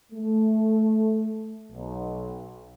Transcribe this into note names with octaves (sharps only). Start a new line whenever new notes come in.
A3
B1